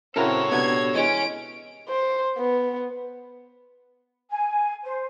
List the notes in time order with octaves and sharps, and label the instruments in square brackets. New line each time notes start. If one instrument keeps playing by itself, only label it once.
[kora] C#3 A#4 [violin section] C4 [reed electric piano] C#4 E4 F#4 [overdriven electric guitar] A4 C#5
[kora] C3 [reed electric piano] B3 D4 F#4 [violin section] G#6
[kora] E3 G#3 C#5 [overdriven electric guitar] C#4 [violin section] D7
[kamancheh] C5
B3
[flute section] G#5
C5